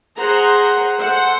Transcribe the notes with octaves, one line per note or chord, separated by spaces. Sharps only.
G#4 C5 F#5 A#5
A4 C5 F#5